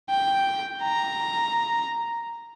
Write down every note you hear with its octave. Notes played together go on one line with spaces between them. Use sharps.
G5
A#5